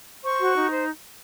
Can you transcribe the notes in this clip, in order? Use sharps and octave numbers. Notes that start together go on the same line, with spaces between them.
C5 C#6
F#4
D#4
C5